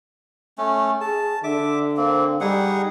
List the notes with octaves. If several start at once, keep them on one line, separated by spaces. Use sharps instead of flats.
A3 C#4
G#4 A5
D3 E5 D6
A#3 C4
G3 D#4 G#4 F#5